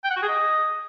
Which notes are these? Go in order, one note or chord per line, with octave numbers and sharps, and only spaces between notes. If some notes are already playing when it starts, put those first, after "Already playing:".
G5
F#5
F#4
G#4
D#5